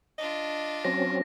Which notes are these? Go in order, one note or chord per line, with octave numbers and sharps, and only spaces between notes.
D4 F4 D#5
F#3 C4 C#4 A#6